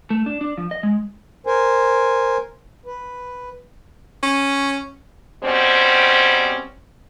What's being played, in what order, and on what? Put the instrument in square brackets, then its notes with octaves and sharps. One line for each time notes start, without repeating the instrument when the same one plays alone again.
[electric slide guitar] A3
D4
D4
F3
D#5
G#3
[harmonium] A#4 C5 G#5
B4
[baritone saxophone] C#4
[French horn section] B2 G3 C4 C#4 C5